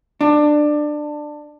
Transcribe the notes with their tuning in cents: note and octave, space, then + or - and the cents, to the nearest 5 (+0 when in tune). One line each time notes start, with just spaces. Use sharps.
D4 +20